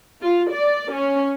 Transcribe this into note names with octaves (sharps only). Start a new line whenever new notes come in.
F4
D5
C#4